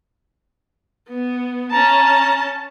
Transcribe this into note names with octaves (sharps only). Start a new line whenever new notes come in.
B3
C#4 A5 A#5